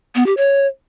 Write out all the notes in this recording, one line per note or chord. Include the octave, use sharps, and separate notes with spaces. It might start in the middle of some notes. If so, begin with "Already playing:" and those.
B3
G4
C#5